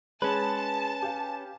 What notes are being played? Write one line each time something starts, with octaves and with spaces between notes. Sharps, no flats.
G#3 C#4 B4 A5
G4 F5 G#5